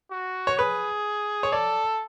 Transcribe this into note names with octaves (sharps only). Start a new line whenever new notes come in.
F#4
C#5
G#4 B4
C#5
A4 D5